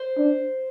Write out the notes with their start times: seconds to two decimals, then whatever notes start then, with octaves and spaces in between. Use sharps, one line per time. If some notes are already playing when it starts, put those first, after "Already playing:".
Already playing: C5
0.17 D4